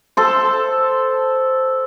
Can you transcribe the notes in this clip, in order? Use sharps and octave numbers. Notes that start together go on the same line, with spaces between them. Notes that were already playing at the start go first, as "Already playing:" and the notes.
A4 C5